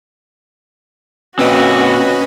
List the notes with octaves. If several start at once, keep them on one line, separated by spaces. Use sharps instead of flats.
A#2 C4 C#4 F#4 B4 D#5